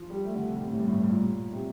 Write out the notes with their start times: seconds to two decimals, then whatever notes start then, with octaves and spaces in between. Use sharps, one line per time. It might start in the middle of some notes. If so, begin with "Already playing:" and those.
Already playing: F3
0.10 G3
0.25 A3
0.35 D3
0.46 C3
0.57 C3
0.68 A2
0.78 G2
0.88 A2
1.00 G2
1.10 A#2
1.52 C3